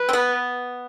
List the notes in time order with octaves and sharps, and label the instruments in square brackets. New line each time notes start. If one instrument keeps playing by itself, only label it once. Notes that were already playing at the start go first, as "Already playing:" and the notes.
Already playing: [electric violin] B4
[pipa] C4
B3